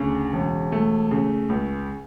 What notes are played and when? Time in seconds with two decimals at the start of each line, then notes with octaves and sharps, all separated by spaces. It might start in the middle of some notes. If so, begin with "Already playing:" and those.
Already playing: D2 C#3
0.33 E1
0.72 A3
1.11 C#3
1.49 C#2